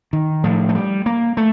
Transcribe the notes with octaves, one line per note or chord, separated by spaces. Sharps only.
D#3
A2 F3
A3
G3
A#3
A3